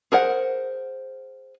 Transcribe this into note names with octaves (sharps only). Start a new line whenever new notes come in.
G#4 A#4 C5 F#5